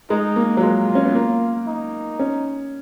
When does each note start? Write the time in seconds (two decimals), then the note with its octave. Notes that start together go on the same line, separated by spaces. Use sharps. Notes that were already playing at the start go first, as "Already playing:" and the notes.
0.10 G#3 D#4
0.36 A#3
0.57 F#3
0.63 G#3 F4
0.95 C#4
1.05 B3
1.15 A#3
1.67 D#4
2.19 C#4